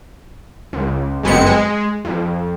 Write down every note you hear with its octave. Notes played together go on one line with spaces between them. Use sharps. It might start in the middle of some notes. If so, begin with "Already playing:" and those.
C#2
G1 F#2 G#3 B3 C4 C#7
G#3
F2